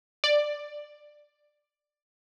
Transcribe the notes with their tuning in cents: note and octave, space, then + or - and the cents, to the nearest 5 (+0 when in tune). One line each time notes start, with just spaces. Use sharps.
D5 +10